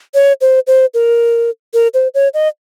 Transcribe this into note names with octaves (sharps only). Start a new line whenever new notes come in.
C#5
C5
C5
A#4
A#4
C5
C#5
D#5